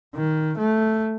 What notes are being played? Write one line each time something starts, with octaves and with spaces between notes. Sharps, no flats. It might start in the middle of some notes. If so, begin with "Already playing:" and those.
D#3
A3